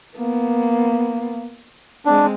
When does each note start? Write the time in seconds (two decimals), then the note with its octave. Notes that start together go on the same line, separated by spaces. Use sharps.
0.18 A#3 B3
2.06 G#3 C4 D4